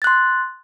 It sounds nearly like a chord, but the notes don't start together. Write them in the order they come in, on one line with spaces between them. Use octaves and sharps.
A6 F#6 C6